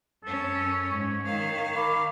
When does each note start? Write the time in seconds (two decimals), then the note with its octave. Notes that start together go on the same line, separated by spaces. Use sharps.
0.24 F#2 C#4 A4
0.91 G#2 C#5
1.26 D#3 F5
1.75 A#4 B5 D6